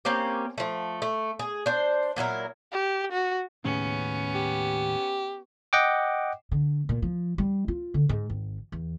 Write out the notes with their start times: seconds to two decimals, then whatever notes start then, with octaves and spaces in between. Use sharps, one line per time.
0.05 A#3 C4 C#4 G4
0.58 F3 A3
1.02 A3
1.39 G#4
1.66 D4 C5
2.16 A#2 F#3 E4 A#4
2.72 G4
3.12 F#4
3.65 D#2 A2 C#3 B3 C#4
4.35 G4
5.73 D#5 F#5 G5 D6
6.51 D3
6.89 A#2
7.02 F3
7.38 G3
7.68 F4
7.94 D3
8.09 G#2
8.30 G#1
8.72 E2